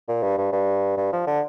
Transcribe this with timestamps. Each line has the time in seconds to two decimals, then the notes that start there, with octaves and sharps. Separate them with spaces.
0.09 A#2
0.23 G2
0.38 G2
0.53 G2
0.97 G2
1.13 F3
1.27 D3